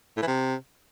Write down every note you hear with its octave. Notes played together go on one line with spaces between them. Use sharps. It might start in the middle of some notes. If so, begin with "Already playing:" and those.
A2
E3
C3